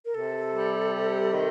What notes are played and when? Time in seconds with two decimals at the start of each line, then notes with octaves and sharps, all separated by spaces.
0.05 A#4
0.14 C3 A4
0.53 G3
0.93 C3
1.31 D#3